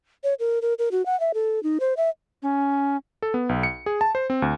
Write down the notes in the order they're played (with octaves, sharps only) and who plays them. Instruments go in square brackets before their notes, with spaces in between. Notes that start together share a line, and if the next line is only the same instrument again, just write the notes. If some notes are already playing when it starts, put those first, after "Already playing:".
[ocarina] C#5
A#4
A#4
A#4
F#4
F#5
E5
A4
D#4
C5
E5
[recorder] C#4
[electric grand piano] A4
B3
B1
C#7
G#4
A5
C5
C4
D2